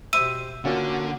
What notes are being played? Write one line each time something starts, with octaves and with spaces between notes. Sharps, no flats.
B2 G4 C5 E5 E6 D#7
D3 A#3 C#4 F4 F#4